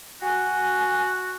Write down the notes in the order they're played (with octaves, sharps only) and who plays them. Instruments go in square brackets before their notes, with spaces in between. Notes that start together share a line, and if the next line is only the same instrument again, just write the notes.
[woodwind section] F#4 [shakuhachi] G#5